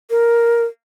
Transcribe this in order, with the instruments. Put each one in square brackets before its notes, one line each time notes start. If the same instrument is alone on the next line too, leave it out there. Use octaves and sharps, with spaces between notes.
[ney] A#4